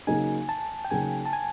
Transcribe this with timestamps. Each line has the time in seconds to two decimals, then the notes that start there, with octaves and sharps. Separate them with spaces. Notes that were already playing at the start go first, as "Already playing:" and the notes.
0.07 C#3 F#3 A#3 D#4 G#5
0.49 A5
0.85 G5
0.91 C#3 F#3 A#3 D#4 G#5
1.26 A5
1.33 G#5